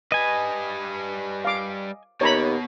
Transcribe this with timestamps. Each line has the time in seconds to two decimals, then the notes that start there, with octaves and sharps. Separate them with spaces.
0.12 G3 B4 D#5 G#5
1.45 F5 D6
2.21 D#2 B2 C#5 A#5 B5